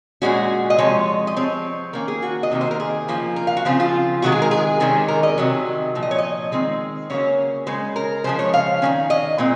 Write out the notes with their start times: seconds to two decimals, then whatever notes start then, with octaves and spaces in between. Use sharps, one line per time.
0.22 A#2 G#3 C#4 F#4
0.70 D#5
0.78 C3 F3 G#3 C#5
1.27 D#5
1.36 F3 C4 C#5
1.93 D#3 A#3 C#4 A#4
2.08 G#4
2.22 F#4
2.43 D#5
2.51 C3 D#3 A#3
2.61 C5
2.71 A#4
2.80 G#4
3.08 C#3 F3 A#3
3.36 A#4
3.47 F5
3.57 F#4
3.65 C#3 F3 C4 F4
3.80 F4
4.22 C3 D#3 G#3 F#4
4.32 G#4
4.42 A#4
4.51 G#4
4.80 C3 D#3 G#3 C#4
5.08 A#4
5.23 D#5
5.38 C3 D#3 F#3
5.95 A#2 F3
6.02 D#5
6.11 C#5
6.18 D#5
6.52 D#3 G#3 C4
7.10 C#3 F#3 A#3 C#4 C#5
7.67 C#3 G#3 C#4 C5
7.96 A#4
8.24 C#3 F3 G#3 C5
8.39 C#5
8.54 F5
8.82 D#3 G#3 C#4
9.10 D#5
9.38 A#2 G#3 C4